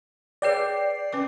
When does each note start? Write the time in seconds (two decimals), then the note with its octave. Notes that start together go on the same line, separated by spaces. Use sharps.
0.42 G#4 B4 C#5 D5 G5 C7
1.13 C#4 B4 D6